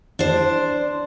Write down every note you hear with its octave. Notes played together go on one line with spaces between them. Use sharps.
D4 C5